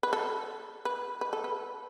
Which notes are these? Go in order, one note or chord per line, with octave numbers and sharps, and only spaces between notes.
B4
A4
B4
B4
A4
B4